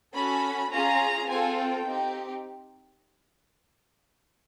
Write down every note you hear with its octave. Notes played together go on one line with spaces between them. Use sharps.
C#4 F#4 A4 B5
C#4 F4 G#4 A#5
C4 F4 A4 G#5
G5
C4 D#4 G4